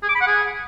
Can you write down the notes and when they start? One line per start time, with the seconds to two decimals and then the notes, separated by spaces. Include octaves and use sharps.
0.03 G#4
0.09 D6
0.15 B5
0.21 F#5
0.27 G#4